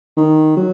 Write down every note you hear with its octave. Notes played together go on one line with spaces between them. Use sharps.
D#3
F#3